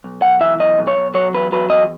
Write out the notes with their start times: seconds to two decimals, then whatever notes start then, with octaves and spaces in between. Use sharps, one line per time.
0.04 B1
0.22 B1 F#5
0.40 E3 E5
0.59 B1 D#5
0.78 B1
0.88 C#5
0.97 B1
1.14 F#3 C#5
1.34 E2 B4
1.52 F#3 B4
1.70 E2 D#5